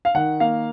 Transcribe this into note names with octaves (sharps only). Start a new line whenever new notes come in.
F5
D#3 F#5
A#3 F5